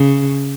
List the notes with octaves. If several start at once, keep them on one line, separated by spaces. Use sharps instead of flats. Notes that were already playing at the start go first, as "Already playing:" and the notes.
Already playing: C#3